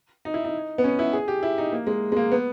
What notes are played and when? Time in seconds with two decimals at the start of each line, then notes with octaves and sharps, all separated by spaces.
0.25 D#4
0.34 E4
0.45 D#4
0.78 B3
0.84 C#4
0.99 E4
1.13 G#4
1.28 G4
1.43 E4
1.58 D#4
1.72 A#3
1.87 G#3
2.12 G#3
2.17 A#3
2.31 B3